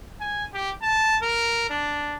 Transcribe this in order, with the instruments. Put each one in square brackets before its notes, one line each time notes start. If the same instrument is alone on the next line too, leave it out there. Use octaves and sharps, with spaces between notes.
[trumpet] G#5
G4
A5
A#4
D4